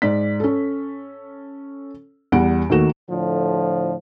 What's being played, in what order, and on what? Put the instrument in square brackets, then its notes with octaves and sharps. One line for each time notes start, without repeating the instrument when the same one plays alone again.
[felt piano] G#2 D5 B6
C#4 A4
E2 G3 F#5 D7
D#2 D#3 A3 F#4 E7
[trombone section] A2 D3 F3